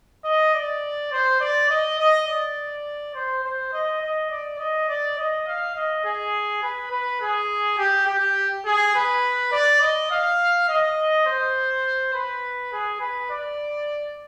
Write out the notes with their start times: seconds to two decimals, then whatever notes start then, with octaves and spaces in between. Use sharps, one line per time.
0.25 D#5
0.54 D5
1.12 C5
1.40 D5
1.70 D#5
1.99 D#5
2.27 D5
3.15 C5
3.44 C5
3.73 D#5
4.02 D#5
4.30 D5
4.59 D#5
4.88 D5
5.18 D#5
5.47 F5
5.75 D#5
6.04 G#4
6.63 B4
6.91 B4
7.21 G#4
7.78 G4
8.07 G4
8.66 G#4
8.95 B4
9.52 D5
9.81 D#5
10.11 F5
10.68 D#5
11.26 C5
12.14 B4
12.72 G#4
13.00 B4
13.30 D5